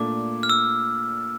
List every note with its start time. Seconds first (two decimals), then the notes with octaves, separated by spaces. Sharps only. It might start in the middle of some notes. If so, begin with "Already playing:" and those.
Already playing: A#2 A3 D4 D6
0.43 F6
0.49 E6